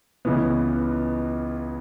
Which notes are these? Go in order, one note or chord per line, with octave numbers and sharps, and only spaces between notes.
C#2 C#3 E3 B3